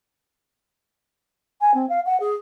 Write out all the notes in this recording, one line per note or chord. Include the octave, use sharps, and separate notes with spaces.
G#5
C4
F5
F#5
G#4